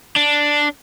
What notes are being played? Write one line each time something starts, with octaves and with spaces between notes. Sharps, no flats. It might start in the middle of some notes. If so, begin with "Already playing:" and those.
D4